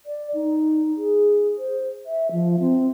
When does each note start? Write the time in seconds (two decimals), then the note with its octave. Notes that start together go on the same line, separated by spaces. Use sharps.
0.06 D5
0.34 D#4
0.97 G#4
1.58 C5
2.06 E5
2.32 F3
2.60 C4